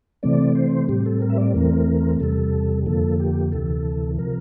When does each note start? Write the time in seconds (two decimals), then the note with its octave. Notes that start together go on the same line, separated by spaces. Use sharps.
0.23 C3 E3 A3 C4 D5
0.55 C5
0.88 A2 G3 C4 G4
1.06 A4
1.22 A#4
1.30 E5
1.38 D5
1.54 E2 E3 A3 C4 A#4
2.20 E2 C3 G3 A4
2.86 F2 D3 F3 A#3 A4
3.20 G4
3.52 D2 C3 E3 A4
4.18 C3 F3 A#4